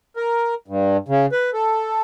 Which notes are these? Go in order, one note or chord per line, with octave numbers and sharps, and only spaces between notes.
A#4
G2
C#3
B4
A4